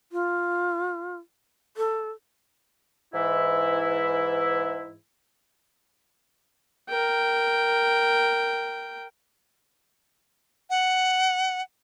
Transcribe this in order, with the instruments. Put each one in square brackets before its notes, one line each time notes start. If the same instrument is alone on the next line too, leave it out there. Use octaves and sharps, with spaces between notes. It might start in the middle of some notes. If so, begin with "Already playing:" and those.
[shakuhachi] F4
A4
[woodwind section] G#2 E3 E4
[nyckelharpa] A#4 G5
[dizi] F#5